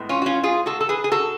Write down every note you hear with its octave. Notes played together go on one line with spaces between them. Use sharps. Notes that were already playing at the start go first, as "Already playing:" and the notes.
Already playing: A2 G#3 B3
C#4 F4
F#4
C#4 F4
F4 G#4
F#4 A4
A4
G#4 B4
G#4
F#4 A4